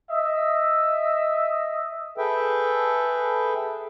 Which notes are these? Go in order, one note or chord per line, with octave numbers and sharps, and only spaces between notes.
D#5 E5
G#4 A4 B4 E5 G5